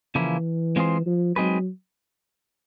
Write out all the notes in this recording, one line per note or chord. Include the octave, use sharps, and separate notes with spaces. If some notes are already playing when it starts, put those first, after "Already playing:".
C#3 E3 F3 A#3 C#4 E4
G#3 C4 F4 G#4 C5
F3
F#3 G#3 C4 D#4 G#4 B4